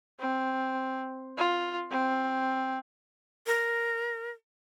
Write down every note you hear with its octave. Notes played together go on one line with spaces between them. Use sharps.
C4
F4
C4
A#4